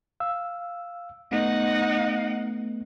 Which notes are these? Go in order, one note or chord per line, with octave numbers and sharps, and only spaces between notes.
F5 E6
A3 B3 D#4 F#5